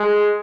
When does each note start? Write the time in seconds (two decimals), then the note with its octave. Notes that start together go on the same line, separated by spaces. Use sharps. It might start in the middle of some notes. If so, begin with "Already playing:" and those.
Already playing: G#3